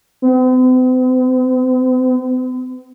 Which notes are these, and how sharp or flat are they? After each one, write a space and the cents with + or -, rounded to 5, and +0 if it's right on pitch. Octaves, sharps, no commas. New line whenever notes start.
C4 -45